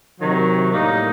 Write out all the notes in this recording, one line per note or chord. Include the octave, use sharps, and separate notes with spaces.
C3 D#3 F#3
A2 G3 A#3 D#4